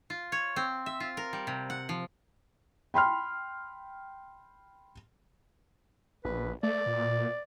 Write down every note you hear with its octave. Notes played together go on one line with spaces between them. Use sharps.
F4
C#5
C4
E5
F4
A#4
G3
C3
F#5
F3
G5 B5 C6 F6
A#1 B4
A3 D5
A#2